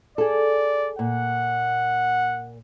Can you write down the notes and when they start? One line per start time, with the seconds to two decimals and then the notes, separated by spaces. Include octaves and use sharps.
0.18 G#4 A4 D5
0.99 A#2 F#5